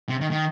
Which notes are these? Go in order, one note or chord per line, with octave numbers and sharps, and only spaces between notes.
C3
D#3
D#3